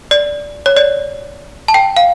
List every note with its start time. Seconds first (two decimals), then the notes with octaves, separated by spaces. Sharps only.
0.11 D5
0.66 C#5
0.77 D5
1.68 A5
1.74 G5
1.97 F5